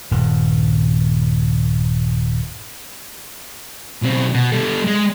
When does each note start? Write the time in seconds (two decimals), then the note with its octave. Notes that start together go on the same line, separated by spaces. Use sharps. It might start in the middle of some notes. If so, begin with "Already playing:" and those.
0.11 D#1 G2
4.03 B1 C4
4.34 B2
4.52 G3 A4
4.87 G#3